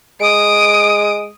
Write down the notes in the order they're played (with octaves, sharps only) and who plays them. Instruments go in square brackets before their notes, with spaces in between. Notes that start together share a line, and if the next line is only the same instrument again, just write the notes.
[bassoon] G#3 [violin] D#6 D7